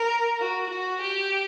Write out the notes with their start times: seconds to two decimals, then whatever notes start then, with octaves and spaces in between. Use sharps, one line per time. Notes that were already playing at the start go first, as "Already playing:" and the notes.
Already playing: A#4
0.39 F#4
0.70 F#4
1.01 G4